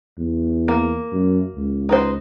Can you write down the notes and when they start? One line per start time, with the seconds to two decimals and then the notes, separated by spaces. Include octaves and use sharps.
0.18 E2
0.68 A#3
1.12 F#2
1.55 C#2
1.89 D#4 B4 C5